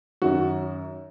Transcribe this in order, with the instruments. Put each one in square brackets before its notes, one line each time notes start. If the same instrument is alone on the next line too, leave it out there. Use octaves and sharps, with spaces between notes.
[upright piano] F#2 D#3 F#4